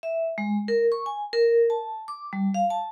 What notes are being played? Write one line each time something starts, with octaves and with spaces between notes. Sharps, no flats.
E5
G#3
A#4
C#6
G#5
A#4
A5
D6
G3
F5
A5